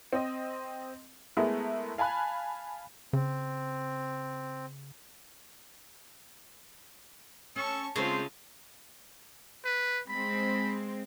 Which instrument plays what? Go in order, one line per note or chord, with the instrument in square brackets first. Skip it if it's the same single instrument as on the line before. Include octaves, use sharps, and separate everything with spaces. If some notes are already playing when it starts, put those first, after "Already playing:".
[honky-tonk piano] C4 D#5
G#3 A3 B3 E4 A#4
F5 G#5 A5 B5 F#6
[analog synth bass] C#3 [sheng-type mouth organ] C4
[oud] C#4 [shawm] A4 [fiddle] A5 C#6
[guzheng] C#3 [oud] G#3 C4 C5 [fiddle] A3 F4 [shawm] C6
[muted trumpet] B4
[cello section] G#3 C4 [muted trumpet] B5